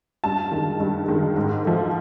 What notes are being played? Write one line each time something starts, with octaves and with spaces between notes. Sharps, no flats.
G2 A5
D#3 G#3
G2
D#3 G#3
G#2
F3 A3